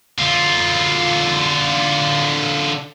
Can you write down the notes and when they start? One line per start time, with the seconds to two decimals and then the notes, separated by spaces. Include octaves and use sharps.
0.18 D3 F4